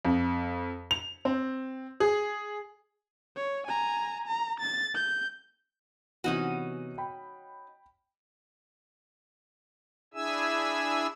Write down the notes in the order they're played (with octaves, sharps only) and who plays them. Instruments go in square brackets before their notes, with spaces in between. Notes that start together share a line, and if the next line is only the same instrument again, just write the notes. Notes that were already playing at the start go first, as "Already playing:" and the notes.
[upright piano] F2
F7
C4
G#4
[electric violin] C#5
G#5 A#5
A#5
A6
G6
[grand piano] C3 E3 B3 [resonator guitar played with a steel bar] C#4 D#4 F#4
[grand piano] G5 B5
[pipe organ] D4 E4 G#4 E5 G#5 E6